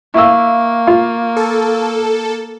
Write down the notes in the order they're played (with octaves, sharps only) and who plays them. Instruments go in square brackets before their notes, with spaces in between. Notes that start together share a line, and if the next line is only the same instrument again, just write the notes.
[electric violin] A#3 [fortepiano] E4 E6 [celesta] F5 C#6
[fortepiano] F4
[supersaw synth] A4